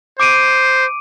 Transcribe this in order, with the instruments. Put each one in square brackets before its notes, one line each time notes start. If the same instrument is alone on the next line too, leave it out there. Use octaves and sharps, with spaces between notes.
[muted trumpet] C5 [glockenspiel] D6 D7 D#7